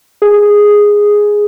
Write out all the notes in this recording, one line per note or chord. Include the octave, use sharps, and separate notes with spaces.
G#4